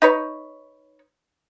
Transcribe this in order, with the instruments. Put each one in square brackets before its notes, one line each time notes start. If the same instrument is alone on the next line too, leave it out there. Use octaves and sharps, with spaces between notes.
[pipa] D#4 B4 C#5